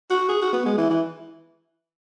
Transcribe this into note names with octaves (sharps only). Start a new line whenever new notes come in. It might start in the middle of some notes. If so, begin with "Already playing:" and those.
F#4
G#4
F#4
B3
G#3
E3
E3